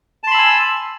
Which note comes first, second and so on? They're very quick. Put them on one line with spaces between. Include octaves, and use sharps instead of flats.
A5 C6 B5 E6 G#5